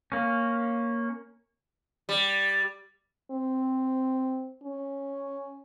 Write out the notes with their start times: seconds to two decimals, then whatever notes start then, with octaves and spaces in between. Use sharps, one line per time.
0.12 A#3 C#4
2.09 G3
3.31 C4
4.63 C#4